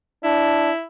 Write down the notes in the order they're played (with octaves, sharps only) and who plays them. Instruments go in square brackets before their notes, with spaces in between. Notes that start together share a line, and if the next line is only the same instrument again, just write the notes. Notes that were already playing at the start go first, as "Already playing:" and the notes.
[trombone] D4 [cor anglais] E4